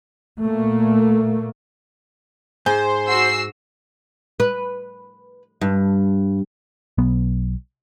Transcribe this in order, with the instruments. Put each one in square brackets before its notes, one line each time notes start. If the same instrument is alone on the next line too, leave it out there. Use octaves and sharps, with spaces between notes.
[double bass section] A#2 A3 A#3
[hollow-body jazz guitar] G#2 [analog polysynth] C5 [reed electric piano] G#5
[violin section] F#4 E6 C7
[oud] B4
G2
[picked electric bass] B1 B3